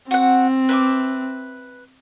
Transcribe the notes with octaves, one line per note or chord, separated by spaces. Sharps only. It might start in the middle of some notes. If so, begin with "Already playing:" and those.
C4 F#4 F#5
B4 E5 D6